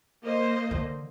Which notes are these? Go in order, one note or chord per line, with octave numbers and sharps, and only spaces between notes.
A#3 C5 D#5
D3